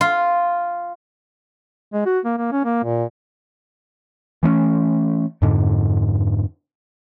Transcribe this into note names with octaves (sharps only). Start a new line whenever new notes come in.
F4
G#3
F#4
A#3
A#3
C#4
A#3
A#2
E3 A3 B3 C#4
F2 G#2 D3